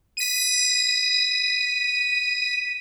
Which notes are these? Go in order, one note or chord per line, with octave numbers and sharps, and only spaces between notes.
B6 D#7